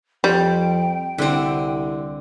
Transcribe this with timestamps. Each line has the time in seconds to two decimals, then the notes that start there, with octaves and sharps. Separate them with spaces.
0.24 F2 G3 G5
1.18 C2 D3 C4